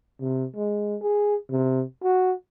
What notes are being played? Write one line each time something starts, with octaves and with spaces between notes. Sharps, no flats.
C3
G#3
G#4
C3
F#4